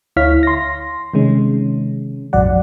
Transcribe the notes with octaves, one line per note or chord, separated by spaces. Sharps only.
D2 E4 C#5 F5 F6 B6
C6 A#6
C3 D#3 G#3 C#4
A#1 F2 G#2 F#3 D5 F#5